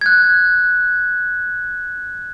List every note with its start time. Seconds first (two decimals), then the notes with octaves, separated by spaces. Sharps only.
0.01 F#6 G#6